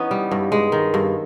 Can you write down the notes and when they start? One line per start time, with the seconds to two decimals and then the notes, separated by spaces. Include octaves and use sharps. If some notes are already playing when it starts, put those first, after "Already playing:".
Already playing: E3 B3 C#4 D#4
0.11 G3
0.31 G2
0.52 G#3
0.72 D#3
0.94 G2